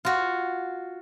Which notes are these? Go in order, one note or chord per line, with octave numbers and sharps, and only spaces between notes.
F4 F#4